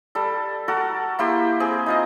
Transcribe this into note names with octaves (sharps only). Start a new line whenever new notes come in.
G3 A4
F#4 A4 A#4
A#3 E4 G4 C6
C4 G#4
D#4 F4 D#5